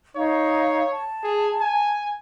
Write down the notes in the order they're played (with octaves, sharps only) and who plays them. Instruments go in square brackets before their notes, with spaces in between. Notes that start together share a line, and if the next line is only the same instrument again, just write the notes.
[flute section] D#4 F5 [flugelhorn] C#5
[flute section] A5
[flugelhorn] G#4
G#5